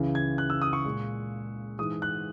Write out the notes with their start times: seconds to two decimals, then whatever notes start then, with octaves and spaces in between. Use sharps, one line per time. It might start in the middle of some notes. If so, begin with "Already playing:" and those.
Already playing: C#2 C#3 E3
0.15 G#6
0.38 F#6
0.50 E6
0.62 D#6
0.73 C#6
0.85 A#2 G#3
1.78 G#2 E3 G#3 D#6
2.02 F#6